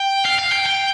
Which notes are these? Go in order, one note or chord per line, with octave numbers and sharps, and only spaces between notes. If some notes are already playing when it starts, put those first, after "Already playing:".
Already playing: G5
F5
F5
G5
G5